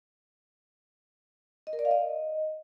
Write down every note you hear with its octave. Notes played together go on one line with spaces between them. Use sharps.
D#5
A#4
D5
F5
D#5